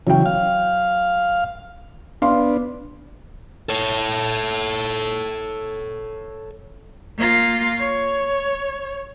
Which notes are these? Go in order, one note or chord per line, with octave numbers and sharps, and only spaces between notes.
C#3 E3 F#3 G5
F5
B3 D4 F5 C6
A4 C#5
A#3 F4
C#5